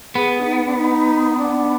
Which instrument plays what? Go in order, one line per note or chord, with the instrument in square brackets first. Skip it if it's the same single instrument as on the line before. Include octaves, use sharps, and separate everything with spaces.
[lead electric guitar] B3 [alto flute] G#4
[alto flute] D4
D#4
D4
D#4
D4